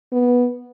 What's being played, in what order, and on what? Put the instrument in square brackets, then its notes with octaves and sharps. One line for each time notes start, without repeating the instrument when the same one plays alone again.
[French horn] B3